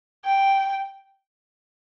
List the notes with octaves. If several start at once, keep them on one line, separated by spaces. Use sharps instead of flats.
G5